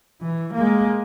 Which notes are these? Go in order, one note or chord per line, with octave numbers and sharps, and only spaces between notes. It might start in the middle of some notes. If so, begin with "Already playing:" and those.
E3
G#3 A#3